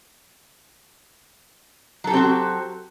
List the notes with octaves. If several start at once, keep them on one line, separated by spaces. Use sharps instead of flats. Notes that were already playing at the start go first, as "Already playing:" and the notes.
F#3 C4 F#4 G4 A4